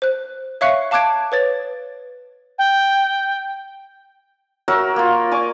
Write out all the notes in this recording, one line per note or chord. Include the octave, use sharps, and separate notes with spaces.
C5 F#6
C#5 E5 F5 C#6 F#6 C#7
F5 A5 D6 F#6 G#6 D7
B4 C#5 A6
G5
F#4 A#4 C#5 E5
A#3 F4
D5 G#5 C#6 D6